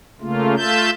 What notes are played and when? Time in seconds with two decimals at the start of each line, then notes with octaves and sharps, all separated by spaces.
0.21 C#3 A3 A#3 F4
0.57 A3 F4 E5 A5 G6